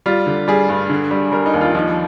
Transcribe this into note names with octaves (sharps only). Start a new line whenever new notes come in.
G3 F4
D3
G3 G#4
G2
D3
G3
G3 A#4
D#4
D#2
F4
F3 D#4